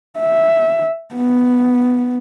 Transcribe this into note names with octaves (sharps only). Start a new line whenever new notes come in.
E5
B3